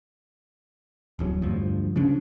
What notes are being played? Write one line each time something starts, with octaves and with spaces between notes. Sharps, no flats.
D1 E2 D#3 F#3
D2 G2 F3
C#3 F3 C#4 D4